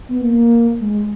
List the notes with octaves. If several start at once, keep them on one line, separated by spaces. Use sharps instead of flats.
B3
A#3
A#3
G#3